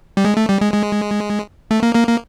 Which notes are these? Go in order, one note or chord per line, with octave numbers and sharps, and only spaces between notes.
G3
G#3
A3
G3
G#3
G#3
A3
A#3
A#3
A#3